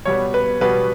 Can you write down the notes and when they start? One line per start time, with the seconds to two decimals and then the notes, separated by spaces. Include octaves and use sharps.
0.05 B2 G3 B3 C#5
0.34 B4
0.61 B2 G3 B3 B4